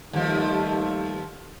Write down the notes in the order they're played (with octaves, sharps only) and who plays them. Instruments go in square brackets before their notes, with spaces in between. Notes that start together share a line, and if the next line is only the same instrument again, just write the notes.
[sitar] D#2 F3 [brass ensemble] G3 A3 D#4